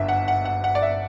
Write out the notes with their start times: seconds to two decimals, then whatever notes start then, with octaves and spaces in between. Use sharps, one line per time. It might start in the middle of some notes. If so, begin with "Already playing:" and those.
Already playing: G1 F#2 D3 E5
0.09 F#5
0.28 F#5
0.45 F#5
0.64 F#5
0.75 D5
0.82 E5